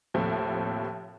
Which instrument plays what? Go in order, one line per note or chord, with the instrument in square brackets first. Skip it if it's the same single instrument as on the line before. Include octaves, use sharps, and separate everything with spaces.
[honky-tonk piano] D#2 A2 C3 F3 A3